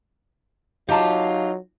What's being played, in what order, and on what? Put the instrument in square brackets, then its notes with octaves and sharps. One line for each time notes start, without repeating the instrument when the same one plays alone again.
[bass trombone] F#3 [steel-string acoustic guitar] D#4 F4 [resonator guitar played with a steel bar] G4 A5 [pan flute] F5